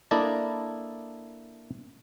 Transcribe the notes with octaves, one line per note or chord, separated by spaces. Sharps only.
A#3 D4 E4 A4 D5 D#5